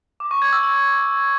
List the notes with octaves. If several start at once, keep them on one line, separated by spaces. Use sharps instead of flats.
D6
C#6
G#6
E6
E6